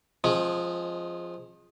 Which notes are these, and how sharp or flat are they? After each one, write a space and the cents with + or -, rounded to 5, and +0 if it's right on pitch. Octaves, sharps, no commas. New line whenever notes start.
F3 +0 G#3 +0 C4 +40